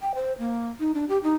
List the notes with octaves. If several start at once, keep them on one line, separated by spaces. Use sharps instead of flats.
G5
C5
A#3
D#4
D4
G4
D#4